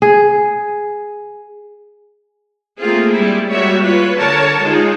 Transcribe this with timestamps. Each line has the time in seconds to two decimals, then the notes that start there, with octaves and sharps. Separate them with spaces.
0.02 G#4
2.80 A3 A#3 C4 F4 G#4
3.14 G3 G#3 E4
3.50 G3 G#3 A#3 F#4 C#5 E5
3.82 F4 B4 C#5
4.15 D3 A#4 C#5 A5
4.61 G#3 D#4 F4 G#4